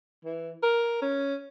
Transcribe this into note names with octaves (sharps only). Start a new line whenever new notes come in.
E3
A#4
C#4